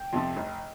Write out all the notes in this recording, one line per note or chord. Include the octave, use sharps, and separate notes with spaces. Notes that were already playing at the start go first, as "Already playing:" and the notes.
Already playing: G5
F2 C3 F3
F1